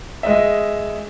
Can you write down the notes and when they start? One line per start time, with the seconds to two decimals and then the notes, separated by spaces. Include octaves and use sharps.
0.23 G#3 D#5 E5